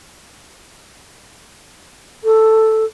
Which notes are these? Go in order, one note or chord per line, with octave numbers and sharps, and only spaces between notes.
A4